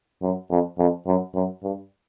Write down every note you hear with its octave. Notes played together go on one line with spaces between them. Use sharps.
F#2
F2
F2
F#2
F#2
G2